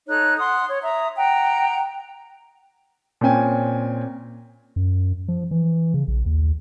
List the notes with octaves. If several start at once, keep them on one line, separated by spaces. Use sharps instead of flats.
D#4 A4 C#5 F#6
F#5 C6 D#6
C#5
E5 A#5 D#6
F#5 G5 A#5
A#2 C4 C#4 G5 G#5
F#2
F3
E3
C#3
A#1
D#2